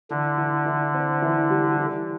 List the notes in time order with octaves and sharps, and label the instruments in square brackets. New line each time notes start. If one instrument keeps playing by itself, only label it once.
[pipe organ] D3 [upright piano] E3
[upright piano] E3
E3
C4
E3
G3
E3